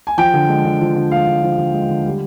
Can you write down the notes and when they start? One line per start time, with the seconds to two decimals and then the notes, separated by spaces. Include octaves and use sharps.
0.07 G#5
0.17 F3 G5
0.34 D3
0.48 G#3
0.65 D3
0.81 F3
0.96 D3
1.11 G#3 F5
1.27 D3
1.43 F3
1.58 D3
1.74 G#3
1.89 D3
2.06 G3